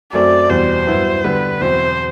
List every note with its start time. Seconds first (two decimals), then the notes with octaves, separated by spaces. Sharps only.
0.13 F#2 F#3 A3 C4 D5
0.49 E2 B2 G3 C5
0.87 G2 F#3 B3 E4
1.24 D3 G3 B3 B4
1.61 E2 B2 F#3 C4 C5